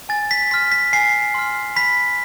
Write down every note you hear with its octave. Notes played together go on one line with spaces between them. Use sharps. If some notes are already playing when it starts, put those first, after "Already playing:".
G#5 A6
B6
C6 F6 B6
B6
G#5 C7
C6 F6
B5 B6